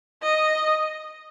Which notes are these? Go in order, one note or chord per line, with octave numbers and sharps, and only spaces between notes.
D#5